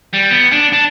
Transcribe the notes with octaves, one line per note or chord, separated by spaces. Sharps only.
G3
B3
D4
D4